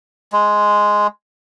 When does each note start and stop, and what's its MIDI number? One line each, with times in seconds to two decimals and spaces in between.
0.32 1.07 56